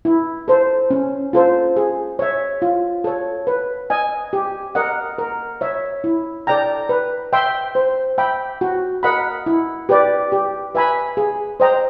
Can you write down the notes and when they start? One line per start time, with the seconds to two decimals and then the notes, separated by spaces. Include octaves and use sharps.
0.05 E4
0.48 A4 C5
0.90 C#4
1.33 F4 A4 C5
1.76 G#4
2.19 C#5 E5
2.62 F4
3.04 A4 C#5
3.47 B4
3.90 D#5 G#5
4.33 G4
4.75 A#4 D#5 F#5
5.18 A#4
5.61 C#5 E5
6.04 E4
6.47 A4 D5 G5 A#5
6.89 B4
7.33 E5 G5 C6
7.75 C5
8.18 E5 G5 B5
8.61 F#4
9.03 A#4 D#5 F#5 B5
9.46 E4
9.89 G4 B4 D5
10.32 G4
10.75 B4 E5 G#5 B5
11.17 G#4
11.60 C5 D#5 G5 A#5